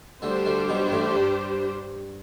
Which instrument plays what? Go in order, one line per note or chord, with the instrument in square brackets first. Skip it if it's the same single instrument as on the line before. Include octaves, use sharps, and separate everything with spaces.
[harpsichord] D2 D3 [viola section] G3 D4 G4 C5
[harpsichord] D2 D3
B1 B2
G2
A1 A2
G2